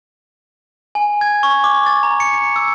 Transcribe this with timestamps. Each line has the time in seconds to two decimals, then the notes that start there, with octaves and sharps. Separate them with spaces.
0.95 G#5
1.21 G#6
1.43 C#6
1.64 D6
1.86 A6
2.03 A#5
2.20 C#7
2.34 C#7
2.56 E6